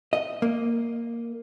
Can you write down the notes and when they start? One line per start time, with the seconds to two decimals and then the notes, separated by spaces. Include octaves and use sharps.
0.13 D#5
0.42 A#3